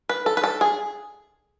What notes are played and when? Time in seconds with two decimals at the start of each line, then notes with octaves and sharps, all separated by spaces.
0.09 B4
0.26 A4
0.37 B4
0.44 A4
0.61 G#4